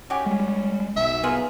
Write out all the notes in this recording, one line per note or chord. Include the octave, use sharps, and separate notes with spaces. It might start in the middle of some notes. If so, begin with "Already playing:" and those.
C#4 F#4 G4 G#5
G3 G#3
B1 E5
A#3 B3 F4 G#4